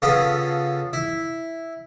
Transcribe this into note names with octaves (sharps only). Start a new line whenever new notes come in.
C#3 B3 F4 G#4 A4
E4